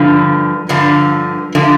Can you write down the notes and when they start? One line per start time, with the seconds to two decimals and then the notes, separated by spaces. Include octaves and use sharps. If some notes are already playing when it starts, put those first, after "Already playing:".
Already playing: G2 D3 F3
0.69 G2 D3 F3
1.55 D3 F3